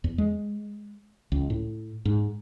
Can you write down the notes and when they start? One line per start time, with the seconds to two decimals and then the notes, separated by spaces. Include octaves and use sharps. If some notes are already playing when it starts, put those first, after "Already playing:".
0.04 E2
0.18 G#3
1.32 C#2
1.50 A2
2.05 G#2